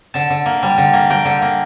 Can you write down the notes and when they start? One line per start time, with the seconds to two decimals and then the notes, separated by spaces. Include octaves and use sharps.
0.14 D3 A5
0.30 D3
0.46 A#3
0.63 G3
0.78 D3
0.93 A#3
1.10 A#3 G5
1.25 D3
1.42 A#3